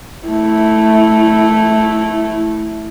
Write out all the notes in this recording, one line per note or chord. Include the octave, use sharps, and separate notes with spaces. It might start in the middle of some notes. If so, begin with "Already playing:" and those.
A3 E4